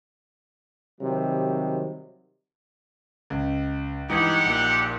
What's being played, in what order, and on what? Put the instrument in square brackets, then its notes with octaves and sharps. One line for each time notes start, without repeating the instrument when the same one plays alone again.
[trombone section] C3 D#3 F#3 G3
[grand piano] C#2
[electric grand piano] G2 E3 G#3 [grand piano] D#4 [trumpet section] G4 F#5
[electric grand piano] A#1 A#2